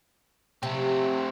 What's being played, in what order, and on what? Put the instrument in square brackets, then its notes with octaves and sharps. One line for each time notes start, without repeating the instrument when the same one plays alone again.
[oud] C3 [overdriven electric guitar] A3 C4